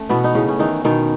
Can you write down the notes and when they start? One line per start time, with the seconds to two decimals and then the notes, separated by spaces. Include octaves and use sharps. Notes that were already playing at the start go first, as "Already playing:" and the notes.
Already playing: A3 C#4
0.09 B2 E3 B3
0.24 D#4
0.35 A2 C#3 C#4
0.49 C#4
0.59 D#3 E3 D#4
0.85 B2 D#3 D#4